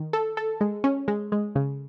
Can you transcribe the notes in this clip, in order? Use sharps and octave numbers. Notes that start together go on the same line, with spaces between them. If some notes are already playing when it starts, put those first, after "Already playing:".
Already playing: D#3
A4
A4
G#3
C#4
G#3
G#3
C#3